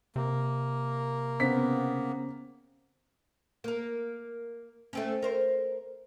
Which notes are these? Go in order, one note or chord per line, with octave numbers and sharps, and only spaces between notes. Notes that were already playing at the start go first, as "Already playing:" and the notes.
C3 A#3
C#3 B3 C4 B6
A#3 A#4
A3 C4 C#4
A#4 C5